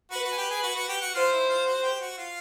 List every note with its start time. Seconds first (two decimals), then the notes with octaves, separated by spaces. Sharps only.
0.11 F#4 B4 F#5
0.24 F#4 F#5
0.32 G#5
0.37 G4 G5
0.50 G#4 G#5
0.63 F#4 F#5
0.75 F#4 F#5
0.88 G4 G5
1.01 F#4 F#5
1.14 F4 C5 F5
1.32 E4 E5
1.49 F4 F5
1.66 F#4 F#5
1.83 G4 G5
2.01 F#4 F#5
2.18 F4 F5